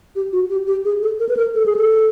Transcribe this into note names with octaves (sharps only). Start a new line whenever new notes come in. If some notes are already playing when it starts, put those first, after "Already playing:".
G4
F#4
G4
G4
G#4
A4
A#4
B4
A#4
A4
G#4
A4